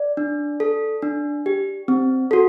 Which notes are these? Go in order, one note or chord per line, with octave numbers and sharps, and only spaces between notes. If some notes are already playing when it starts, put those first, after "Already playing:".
Already playing: D5
D4
A4
D4
G4
C4
F#4 A4